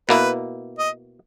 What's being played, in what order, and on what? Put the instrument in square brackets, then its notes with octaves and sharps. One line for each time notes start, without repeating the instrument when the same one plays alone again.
[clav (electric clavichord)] B2 A#3 E4 [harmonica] B4
[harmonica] D#5